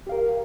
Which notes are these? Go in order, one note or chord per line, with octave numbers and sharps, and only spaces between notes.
G4 A#4 F5